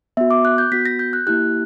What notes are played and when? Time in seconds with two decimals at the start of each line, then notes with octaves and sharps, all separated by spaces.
0.17 B3 F#4 E5
0.31 D6
0.45 F#6
0.58 G6
0.72 B3 F#4 B6
0.86 A#6
0.99 G6
1.13 F#6
1.27 A#3 E4 G4 F#6